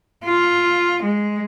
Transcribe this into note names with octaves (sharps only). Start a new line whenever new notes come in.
F4
G#3